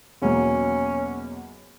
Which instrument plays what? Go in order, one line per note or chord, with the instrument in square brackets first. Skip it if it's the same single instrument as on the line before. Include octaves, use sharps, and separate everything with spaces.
[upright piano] E2 B2 F#3 A#3 [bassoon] C#4